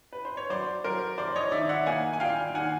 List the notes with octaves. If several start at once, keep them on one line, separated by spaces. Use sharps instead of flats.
B4
C5
C#5
F#3 C5 D5
F#3 A#4 C5
F1 C5 D5
C#5 D#5
D#3 D5 E5
E5 F#5
A#3 F#5 G#5
G#5
A#2 F5 G5
D#3 F#5 G#5